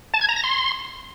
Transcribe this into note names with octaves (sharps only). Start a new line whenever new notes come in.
A5
G#6
A#5
A#6
C6